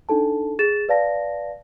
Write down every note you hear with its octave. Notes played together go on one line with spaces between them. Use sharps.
D4 D#4 A4 A5
G#4 A6 E7
B4 D5 F5 A5 A#6